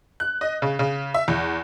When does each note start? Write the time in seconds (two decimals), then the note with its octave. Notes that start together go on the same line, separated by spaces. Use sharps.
0.20 F#6
0.41 D#5
0.62 C#3
0.79 C#3
1.14 E5
1.28 E2